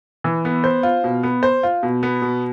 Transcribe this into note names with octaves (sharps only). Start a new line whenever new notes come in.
E3
B3
C5
F4
B2
B3
C5
F4
B2
B3
B2